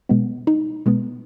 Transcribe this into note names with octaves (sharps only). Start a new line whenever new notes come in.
B2 G#3 B3
D#4
B2 G#3 B3